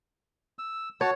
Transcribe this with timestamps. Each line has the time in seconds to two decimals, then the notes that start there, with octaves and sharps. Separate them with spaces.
0.59 E6
1.01 F#4 C#5 A5